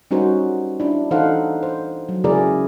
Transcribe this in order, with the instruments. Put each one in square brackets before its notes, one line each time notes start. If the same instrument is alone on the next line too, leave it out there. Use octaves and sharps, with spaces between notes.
[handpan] G3 C#4 D#4 F#4 A#4 C5
D4 E4
E3 D#4 A4 C5 F5 F#5
C5
F#3
C#3 A#3 E4 G#4 A#4 D5